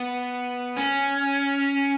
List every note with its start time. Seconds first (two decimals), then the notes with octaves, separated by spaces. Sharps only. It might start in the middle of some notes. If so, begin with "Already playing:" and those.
Already playing: B3
0.77 C#4